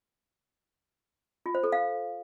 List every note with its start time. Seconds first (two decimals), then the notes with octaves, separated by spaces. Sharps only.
1.46 F4
1.55 C5
1.64 A4
1.72 F5